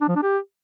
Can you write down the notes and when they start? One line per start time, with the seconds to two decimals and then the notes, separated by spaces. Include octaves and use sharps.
0.01 D4
0.08 F3
0.16 D4
0.23 G4